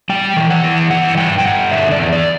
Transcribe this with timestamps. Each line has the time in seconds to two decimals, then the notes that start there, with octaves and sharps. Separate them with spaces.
0.09 G3 G5
0.36 E3
0.50 F#5
0.64 E3
0.90 G2 F#5
1.17 G2 G5
1.38 G5
1.45 G2 F#5
1.71 D3 E5
1.92 D5
1.99 E2
2.12 D5